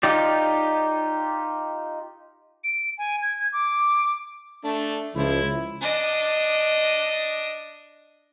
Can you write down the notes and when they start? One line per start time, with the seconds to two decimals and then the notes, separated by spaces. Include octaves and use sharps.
0.03 D#4 F4 G4 D5
2.64 D7
2.98 G#5
3.22 G#6
3.53 D6
4.64 A3 D4
5.15 C#2 F3 E4
5.81 D4 D#5